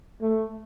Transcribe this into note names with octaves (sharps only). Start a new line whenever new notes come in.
A3